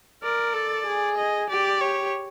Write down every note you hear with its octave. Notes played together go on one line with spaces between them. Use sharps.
A#4 D5
A4
G#4
D#5
G4 D5
C#5